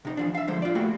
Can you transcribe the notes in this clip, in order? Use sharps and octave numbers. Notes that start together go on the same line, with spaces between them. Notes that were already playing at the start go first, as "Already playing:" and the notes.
C3 D#4
E3 F3 D4
E5 F5
D3 F3 G#3 C5
F4 D5
A3 A#3 F#4 G4